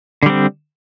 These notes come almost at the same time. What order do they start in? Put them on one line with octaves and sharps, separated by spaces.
D3 G3 C4